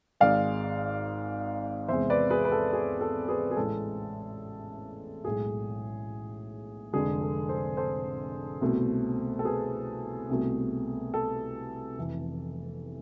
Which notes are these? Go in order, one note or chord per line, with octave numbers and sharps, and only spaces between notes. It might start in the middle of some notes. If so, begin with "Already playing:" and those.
G#1 G#2 G#3 D5 F5
E2 C3 G#3 C5 E5
B4 D5
G#4 B4
B4
A4
G#4
A4
G#4 B4
G#4
A1 A2 G#3 A4
B1 A2 G#3 G#4
F1 F2 D3 G#3 G#4
A4
A4 C5
A4 C5
C2 B2 A3
A4
G#4 B4
C2 B2 A3
A4
F1 F2 E3